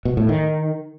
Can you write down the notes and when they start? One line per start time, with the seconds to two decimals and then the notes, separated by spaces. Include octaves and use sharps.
0.05 B2
0.17 A2
0.29 D#3